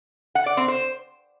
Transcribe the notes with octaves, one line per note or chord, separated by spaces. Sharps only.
F#5
D5
C4
C5